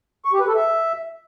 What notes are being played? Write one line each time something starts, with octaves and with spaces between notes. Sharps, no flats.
C#6
G4
B4
A4
E5